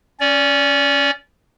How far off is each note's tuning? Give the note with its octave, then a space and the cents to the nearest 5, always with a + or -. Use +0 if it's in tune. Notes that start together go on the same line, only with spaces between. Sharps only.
C#4 +0 D5 -25